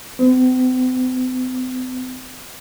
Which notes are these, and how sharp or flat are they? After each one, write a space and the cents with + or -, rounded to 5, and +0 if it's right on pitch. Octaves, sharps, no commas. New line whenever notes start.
C4 -45